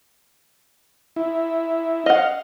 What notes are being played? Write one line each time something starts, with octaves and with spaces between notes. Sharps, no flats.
E4
D#5 F5 F#5